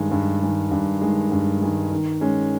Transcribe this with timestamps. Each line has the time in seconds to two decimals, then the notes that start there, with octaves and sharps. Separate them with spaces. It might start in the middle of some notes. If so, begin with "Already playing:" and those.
Already playing: G2 D#3 G#3
0.11 G2
0.42 D#3 G#3
0.71 G2
1.01 D#3 G#3
1.31 G2
1.62 D#3 G#3
1.91 D#3
2.21 G#3 C#4